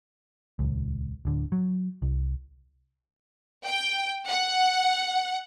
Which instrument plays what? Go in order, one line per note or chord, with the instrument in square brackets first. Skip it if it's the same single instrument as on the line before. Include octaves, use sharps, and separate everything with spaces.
[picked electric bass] D#1 G#1 C#2
D1 D3
F#3
C2
[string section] G5
F#5